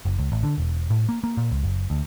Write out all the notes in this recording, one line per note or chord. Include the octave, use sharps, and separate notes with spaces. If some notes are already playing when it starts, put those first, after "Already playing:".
F#1
C#2
A1
D3
E1
A2
A#3
A#3
A#2
C#2
F#1
D2